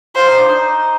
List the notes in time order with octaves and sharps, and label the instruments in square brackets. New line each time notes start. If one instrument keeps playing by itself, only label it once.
[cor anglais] F4 [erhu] C5
[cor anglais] D#4
D4
D#4